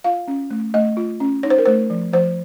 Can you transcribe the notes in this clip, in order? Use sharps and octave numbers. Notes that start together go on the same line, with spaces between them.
F4 F5
C#4
A3
A3 D#5
F4
C#4
D#4 C#5
C5
A#4
A3 C5
F3
F3 C5